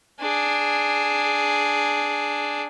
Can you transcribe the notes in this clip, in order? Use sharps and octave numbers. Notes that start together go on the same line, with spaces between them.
D4 G#4